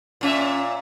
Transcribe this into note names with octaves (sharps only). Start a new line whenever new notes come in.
A#2 C#4 E5